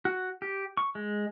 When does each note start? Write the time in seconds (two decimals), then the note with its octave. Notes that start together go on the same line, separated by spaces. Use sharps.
0.05 F#4
0.42 G4
0.77 C#6
0.95 G#3